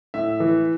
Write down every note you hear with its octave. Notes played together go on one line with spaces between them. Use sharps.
A2 E5
E3